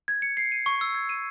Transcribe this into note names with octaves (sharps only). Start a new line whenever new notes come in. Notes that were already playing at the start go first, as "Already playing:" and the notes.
G#6
C#7
C7
D#7
C#6
E6
G#6
D#7